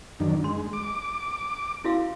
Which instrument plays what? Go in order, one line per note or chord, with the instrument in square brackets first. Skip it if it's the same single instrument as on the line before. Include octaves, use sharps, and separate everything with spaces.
[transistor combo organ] F#2 D#3 D4
[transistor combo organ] G#3 [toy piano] C6
[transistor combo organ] D6
[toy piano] E4 F#4 F5